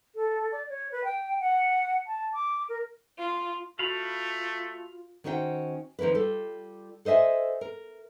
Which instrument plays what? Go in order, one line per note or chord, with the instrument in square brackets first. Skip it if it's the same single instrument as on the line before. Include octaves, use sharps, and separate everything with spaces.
[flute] A4
D5
C#5
B4
G5
F#5
A5
D6
A#4
[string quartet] F4
[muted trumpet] A3 [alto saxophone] F4 [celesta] F#4 [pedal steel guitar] F5 B5
[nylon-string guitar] D#3 C#4 F#4 C5 E5 G5
D#3 F3 A#3 C#4 B4
G3 F4 A4
A4 C5 D#5 E5 G#5
A#4